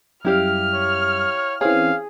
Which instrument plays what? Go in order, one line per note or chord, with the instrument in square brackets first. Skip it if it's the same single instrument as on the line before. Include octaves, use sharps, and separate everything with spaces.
[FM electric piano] F#2 G3 [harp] E4 G4 F5 [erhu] F6
[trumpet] C#5
[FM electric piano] E3 C4 C#4 [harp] G#4 [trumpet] F5